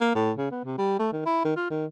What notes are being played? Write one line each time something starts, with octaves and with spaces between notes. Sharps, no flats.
A#3
A2
C#3
B3
C3
G3
A3
D#3
E4
D#3
F4
D#3